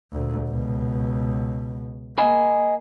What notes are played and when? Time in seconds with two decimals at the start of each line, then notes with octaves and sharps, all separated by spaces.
0.12 D2 A#2
0.49 C#2 B2
2.18 A#3 D#5 G#5 B5